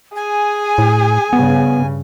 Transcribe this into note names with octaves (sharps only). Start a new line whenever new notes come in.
G#4 G#5
A2
G2 C#3 B3